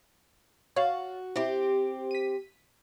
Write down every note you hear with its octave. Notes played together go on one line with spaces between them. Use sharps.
F#4 C#5 F5 A6
C4 E4 G4
B6 D#7